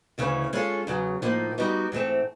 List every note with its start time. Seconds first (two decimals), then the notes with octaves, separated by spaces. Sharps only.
0.18 D2 C#3 E3 A3 C#4
0.53 G#3 C#4 F4 A4
0.87 E2 C#3 F#3
1.22 A2 F3 A#3 D#4
1.58 G3 B3 D#4 F#4
1.92 G#2 E3 A3 C4